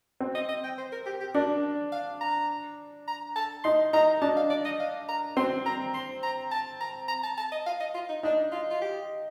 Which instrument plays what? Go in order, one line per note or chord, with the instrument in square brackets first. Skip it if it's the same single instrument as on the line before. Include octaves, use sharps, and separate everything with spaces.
[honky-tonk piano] C4
[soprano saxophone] D#5
D#5
G5
C5
A#4
G4
G4
[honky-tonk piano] D4 [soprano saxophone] A#4
[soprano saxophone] F5
A#5
A#5
A5
[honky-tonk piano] D#4 [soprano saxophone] C6
[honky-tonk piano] D#4 [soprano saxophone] A#5
[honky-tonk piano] D4 [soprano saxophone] A5
[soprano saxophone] F5
D5
D#5
F5
A#5
[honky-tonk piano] C4 [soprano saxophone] C6
[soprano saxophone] A#5
C6
A#5
A5
A#5
A#5
A5
A5
D#5
F5
D#5
F4
D#4
[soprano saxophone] D4 [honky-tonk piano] D#4
[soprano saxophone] F4
F4
G4